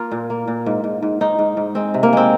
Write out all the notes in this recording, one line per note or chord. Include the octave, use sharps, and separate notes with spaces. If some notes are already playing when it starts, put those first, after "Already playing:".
Already playing: A#3 F4 A#4
A#2
A#3
A#2
G#2
G#2
G#2
G#2 D#4
G#2
G#2
G#3 C4
C3
A#3
G#3 C4